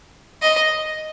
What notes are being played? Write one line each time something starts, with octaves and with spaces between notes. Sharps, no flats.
D#5